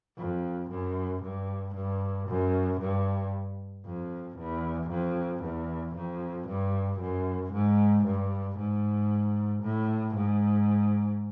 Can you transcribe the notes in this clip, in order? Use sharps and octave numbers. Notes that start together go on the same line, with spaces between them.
F2
F#2
G2
G2
F#2
G2
F2
E2
F2
E2
F2
G2
F#2
G#2
G2
G#2
A2
G#2